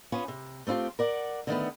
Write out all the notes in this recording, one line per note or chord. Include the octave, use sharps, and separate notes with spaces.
B3 C#4 F4
C3
A3 C4 D#4 F4 G4
A#4 D5 F#5
D3 D#3 A3 B3